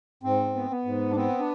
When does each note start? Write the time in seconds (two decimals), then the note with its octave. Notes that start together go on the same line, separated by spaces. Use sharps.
0.23 G#2 C4
0.55 B3
0.71 B3
0.85 G#2
1.11 D4
1.16 B3 C4
1.39 D4